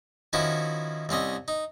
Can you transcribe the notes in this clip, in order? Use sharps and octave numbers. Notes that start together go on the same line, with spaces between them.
D#3 F3 C#4 E4 F#4
C2 C4 C#4 D#5
D#4